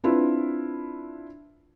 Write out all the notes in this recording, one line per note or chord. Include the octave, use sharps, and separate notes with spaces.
C4 D4 E4 F4 B4